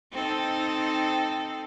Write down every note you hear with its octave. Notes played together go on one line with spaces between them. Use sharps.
C4 D#4 A4